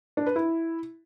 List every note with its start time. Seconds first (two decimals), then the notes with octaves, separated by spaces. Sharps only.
0.17 D4
0.26 B4
0.36 E4